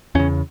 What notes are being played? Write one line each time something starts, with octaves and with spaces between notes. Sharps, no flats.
E2 C#3 C#4